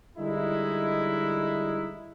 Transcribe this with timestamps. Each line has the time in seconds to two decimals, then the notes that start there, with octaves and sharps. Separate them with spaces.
0.18 D3 G3 G#3 D#4 E4